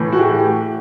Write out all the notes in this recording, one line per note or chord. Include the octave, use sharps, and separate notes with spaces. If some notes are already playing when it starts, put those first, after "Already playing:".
Already playing: A2 E3
F#4
G4